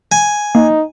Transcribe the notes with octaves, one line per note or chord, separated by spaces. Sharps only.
G#5
A#3 D#4